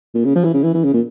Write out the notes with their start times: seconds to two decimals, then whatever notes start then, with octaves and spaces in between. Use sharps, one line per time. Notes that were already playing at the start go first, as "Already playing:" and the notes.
0.15 A#2
0.25 C#3
0.35 F3
0.44 E3
0.54 C#3
0.64 E3
0.74 E3
0.84 C#3
0.94 A#2